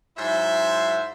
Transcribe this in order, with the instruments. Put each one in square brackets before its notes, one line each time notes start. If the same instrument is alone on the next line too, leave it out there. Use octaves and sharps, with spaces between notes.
[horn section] G#2 F#3 E4 C5 E5